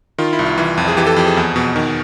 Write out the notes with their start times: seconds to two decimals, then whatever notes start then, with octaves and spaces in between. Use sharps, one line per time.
0.18 D#3 F4
0.33 E4
0.39 C2
0.46 F4
0.58 E3
0.78 F2
0.88 G#4
0.97 E3 G4
1.07 A4
1.16 F2 G4
1.27 G#4
1.37 E2
1.56 B2
1.76 D#3